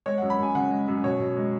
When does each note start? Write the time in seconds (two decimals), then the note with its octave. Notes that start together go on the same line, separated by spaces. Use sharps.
0.06 G#3 C#5
0.18 F#2 F#5
0.30 B5
0.38 F#2 G#5
0.55 C#3 F#5
0.71 G#3
0.88 F#2
1.03 B2 C#5
1.20 B2
1.36 G#3